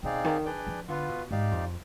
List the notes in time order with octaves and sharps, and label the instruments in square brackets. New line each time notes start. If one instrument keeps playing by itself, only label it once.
[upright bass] B2 [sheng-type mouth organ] C4 D#4 G#4 D5 F5
[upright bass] D#3
[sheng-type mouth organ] D4 G#4 B4 D5 G5
[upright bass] F3
[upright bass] D3 [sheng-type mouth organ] B3 F4 B4 F5
[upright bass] B2
[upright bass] G#2 [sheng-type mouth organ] D#4 G4 D5 F5
[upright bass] F2